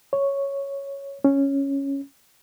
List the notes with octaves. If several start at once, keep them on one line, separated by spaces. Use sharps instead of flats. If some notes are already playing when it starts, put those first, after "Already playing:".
C#5
C#4